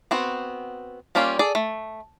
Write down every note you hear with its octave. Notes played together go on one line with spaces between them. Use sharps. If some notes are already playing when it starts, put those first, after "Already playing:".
B3 C4 F#4
G3 A#3 C#4 F4 G4
G#4 A4 D5
A3